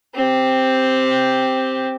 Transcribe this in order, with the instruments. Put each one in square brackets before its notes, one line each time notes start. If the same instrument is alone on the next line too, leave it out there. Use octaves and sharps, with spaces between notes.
[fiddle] C4 G4